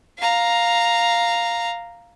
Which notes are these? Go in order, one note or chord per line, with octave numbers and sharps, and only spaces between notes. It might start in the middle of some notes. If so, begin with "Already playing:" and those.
F5 A#5